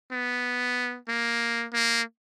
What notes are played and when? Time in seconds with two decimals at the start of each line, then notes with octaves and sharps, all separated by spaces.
0.11 B3
1.08 A#3
1.73 A#3